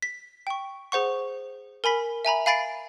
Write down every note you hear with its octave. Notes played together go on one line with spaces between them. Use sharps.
B6
G5 C#6
G#4 C5 F#5 C#6
A#4 G#5 B5 B6
E5 G#5 A#5 B5
F5 G#5 B5 A6 C7 D7